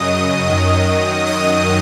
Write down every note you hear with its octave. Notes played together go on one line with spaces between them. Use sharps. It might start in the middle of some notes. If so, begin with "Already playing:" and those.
Already playing: F#2 C#3 F#3 D#5 D#6
F#2 D#3 F#3
F#2 D#3 F#3 D#5 D#6